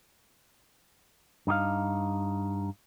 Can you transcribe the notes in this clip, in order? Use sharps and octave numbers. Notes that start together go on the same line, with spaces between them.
G2 D#4 G4 F5